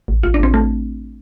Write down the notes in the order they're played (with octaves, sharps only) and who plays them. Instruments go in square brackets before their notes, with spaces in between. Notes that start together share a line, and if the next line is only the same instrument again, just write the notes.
[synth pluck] A1
A1 F4
D4
A1 C4
A3